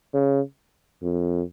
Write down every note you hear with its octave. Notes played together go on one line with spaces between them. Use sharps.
C#3
F2